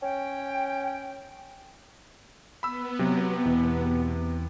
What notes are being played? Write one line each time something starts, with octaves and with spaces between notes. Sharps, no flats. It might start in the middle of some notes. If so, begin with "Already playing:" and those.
C#4 G5
B3 B5 E6
C3 F#3
E2 B2 E3